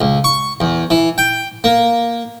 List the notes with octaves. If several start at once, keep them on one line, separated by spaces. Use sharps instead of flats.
C#2
C#6
E2
E3
G5
A#3